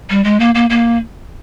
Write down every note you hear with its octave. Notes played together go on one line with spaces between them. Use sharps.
G3
G#3
A#3
A#3
A#3